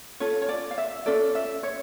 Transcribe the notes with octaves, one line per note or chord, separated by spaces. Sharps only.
C#4 F4 A4 C#5
C#5
D5
F5
E5
C#4 F4 A4 D5
E5
C#5